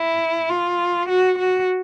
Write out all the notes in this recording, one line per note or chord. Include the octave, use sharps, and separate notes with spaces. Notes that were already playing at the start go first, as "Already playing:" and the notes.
Already playing: E4
F4
F#4
F#4